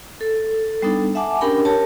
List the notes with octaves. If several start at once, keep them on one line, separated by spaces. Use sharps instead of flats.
A4
G3 B3 D4 D#4 A4
E5 F#5 G#5 A5 D6
C#4 D4 G4 A#4 G5 B5
G4 A#4 C#5 A5